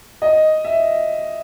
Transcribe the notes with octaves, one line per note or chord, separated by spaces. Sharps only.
D#5
E5